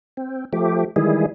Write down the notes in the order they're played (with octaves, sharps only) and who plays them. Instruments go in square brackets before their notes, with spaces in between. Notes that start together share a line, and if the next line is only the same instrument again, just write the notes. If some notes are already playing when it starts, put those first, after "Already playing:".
[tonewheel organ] C4
F3 A3 G4
D#3 E3 G3 G#3 E4 G#4